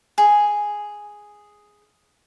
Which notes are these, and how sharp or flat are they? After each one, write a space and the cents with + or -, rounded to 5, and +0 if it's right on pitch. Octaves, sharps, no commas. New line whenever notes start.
G#4 +0